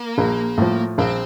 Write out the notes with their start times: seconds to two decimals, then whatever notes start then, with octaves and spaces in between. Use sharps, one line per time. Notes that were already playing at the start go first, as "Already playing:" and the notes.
Already playing: A#3
0.18 A#1
0.58 A2 F3
0.98 A#1 C4